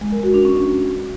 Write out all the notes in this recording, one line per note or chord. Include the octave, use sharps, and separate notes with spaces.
G#3
A#4
F#4
D4
C#4